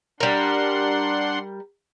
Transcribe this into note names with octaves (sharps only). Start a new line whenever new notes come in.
G3 D4 A#4 F#5 C6